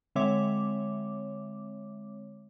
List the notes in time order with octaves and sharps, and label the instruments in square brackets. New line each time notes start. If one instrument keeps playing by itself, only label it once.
[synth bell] D3 G#3 C4 C#5 E5 D6